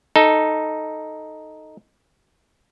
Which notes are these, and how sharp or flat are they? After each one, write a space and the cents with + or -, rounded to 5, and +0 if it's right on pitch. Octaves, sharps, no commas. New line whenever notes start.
D#4 +0 A4 +0